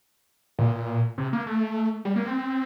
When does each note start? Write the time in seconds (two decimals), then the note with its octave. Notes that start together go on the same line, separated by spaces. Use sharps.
0.59 A#2
1.18 C3
1.33 A#3
1.46 A3
2.05 G3
2.16 A#3
2.25 C4